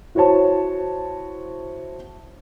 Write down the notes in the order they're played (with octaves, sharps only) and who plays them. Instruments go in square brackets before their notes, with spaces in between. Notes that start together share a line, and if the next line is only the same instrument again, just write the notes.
[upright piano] E4 F#4 C5 C#5 A5